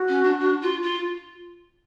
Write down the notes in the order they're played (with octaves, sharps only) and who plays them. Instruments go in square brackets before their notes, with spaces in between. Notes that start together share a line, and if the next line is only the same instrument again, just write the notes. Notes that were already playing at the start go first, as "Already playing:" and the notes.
Already playing: [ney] F#4
[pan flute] C#4
D4
D4
F4
F4